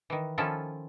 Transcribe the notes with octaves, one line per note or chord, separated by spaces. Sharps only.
D#3 E3
D#3 F3 C#4 E4 F4 A4